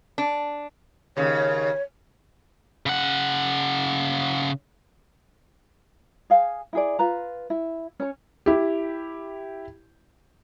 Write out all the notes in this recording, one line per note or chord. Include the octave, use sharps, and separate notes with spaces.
D4
D#2 C#3 C#5
C#3 F#5
G#4 F5 G#5
E4 G#4 D5
F4 B4 A#5
E4
C#4 C#5
E4 G4